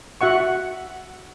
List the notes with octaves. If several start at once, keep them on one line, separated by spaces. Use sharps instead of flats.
F#4 E5 F#5 C#6